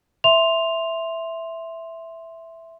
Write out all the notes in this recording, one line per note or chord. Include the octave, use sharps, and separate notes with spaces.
E5 C6 F7